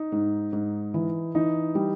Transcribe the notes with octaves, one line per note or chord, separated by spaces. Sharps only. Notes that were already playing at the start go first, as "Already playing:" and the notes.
Already playing: D#4
G#2
G#2
E3
E3 D#4
G3